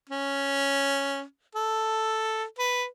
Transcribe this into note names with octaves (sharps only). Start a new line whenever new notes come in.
C#4
A4
B4